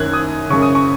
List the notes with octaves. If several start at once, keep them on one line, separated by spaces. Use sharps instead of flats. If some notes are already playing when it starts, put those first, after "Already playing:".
Already playing: F#2 D#3 F#6 G#6
D#6
F#2 C#3 C#6
D#6
C#6